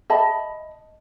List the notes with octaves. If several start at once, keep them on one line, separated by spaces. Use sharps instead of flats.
D#5 E5 A5 B5